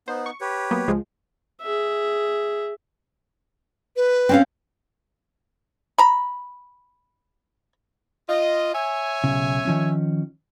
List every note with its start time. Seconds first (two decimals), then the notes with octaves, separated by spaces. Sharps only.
0.08 B3 D#4 C5
0.26 C#6
0.41 G4 B4 C#5
0.71 F#3 A#3 B3
0.87 C#2 F3 G#3
1.62 G#4 E5
3.96 B4
4.29 C4 C#4 F5
5.98 A#5 B5
8.29 F4 D#5
8.74 C#5 E5 G#5
9.24 B1 C#3
9.65 D#3 F3 C#4